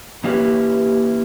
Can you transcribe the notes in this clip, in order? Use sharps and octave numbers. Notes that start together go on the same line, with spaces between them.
E3 A#3 C#4 E4 G4 B4